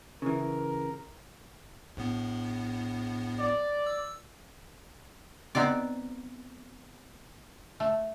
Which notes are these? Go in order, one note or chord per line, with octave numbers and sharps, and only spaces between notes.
C#3 E3 A#4
A#1 A2 B3
D5
E6
B3 C4 D#4 D5
A3